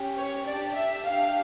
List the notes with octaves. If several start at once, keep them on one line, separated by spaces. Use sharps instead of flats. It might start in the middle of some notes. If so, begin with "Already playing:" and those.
Already playing: C#4 G4
C#5
D4 D5
G4
E5
D4 G4 F5